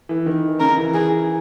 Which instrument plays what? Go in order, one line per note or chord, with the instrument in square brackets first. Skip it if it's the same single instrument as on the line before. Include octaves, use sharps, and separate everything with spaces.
[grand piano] E3
D#3
[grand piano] C#3 [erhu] A#4
[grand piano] E3
[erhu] G#4